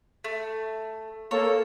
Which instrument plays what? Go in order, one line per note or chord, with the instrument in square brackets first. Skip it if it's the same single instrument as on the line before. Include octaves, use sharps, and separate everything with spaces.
[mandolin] A3
[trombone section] A#3 A4 [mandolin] C#5